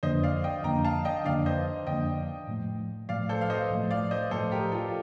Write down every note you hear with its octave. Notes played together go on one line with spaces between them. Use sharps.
F2 D3 F3 A#3 D4 C5 D#5
D5 F5
D#5 G5
F2 D3 F3 A#3 D4 G5 A#5
F5 A5
D#5 G5
F2 D3 F3 A#3 D4 D5 F5
C5 D#5
F2 D3 F3 A#3 D4 D#5 G5
A2 F3 A3
A2 F3 A3 D5 F5
A4 C5
F5
C5 D#5
A2 F3 A3
D5 F5
C5 D#5
A2 F3 A3 A4 C5
G4 A#4
F4 A4